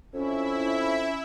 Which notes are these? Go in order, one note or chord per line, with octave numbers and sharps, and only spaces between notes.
F2 C#4 E4 E5